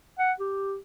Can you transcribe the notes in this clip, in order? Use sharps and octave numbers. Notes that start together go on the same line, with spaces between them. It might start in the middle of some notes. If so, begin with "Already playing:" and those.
F#5
G4